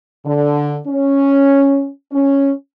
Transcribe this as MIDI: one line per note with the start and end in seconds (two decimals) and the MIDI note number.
0.25 0.76 50
0.87 1.88 61
2.12 2.51 61